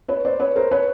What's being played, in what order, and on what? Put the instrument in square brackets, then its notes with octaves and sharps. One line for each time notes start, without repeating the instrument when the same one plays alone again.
[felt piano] B4 C#5
C5 D5
B4 C#5
A#4 C5
B4 C#5